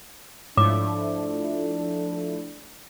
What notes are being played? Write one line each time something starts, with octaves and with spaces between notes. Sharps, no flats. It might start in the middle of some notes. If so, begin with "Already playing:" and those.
G#2 F3 A3 D4 E4 C#5 D6 E7